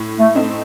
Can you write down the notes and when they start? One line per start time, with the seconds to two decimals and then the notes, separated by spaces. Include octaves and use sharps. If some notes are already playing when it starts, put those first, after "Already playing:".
Already playing: A2
0.19 A3
0.35 A3 C4 D#4